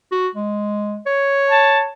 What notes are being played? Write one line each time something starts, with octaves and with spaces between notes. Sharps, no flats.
F#4
G#3
C#5
A5